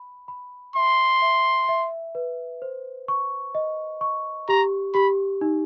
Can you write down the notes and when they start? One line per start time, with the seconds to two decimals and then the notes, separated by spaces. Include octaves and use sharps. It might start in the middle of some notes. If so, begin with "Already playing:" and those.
Already playing: B5
0.28 B5
0.76 E5 C6
1.22 E5
1.69 E5
2.15 B4
2.62 C5
3.08 C#6
3.55 D#5
4.01 C#6
4.49 G4 A#5
4.94 G4 B5
5.41 D#4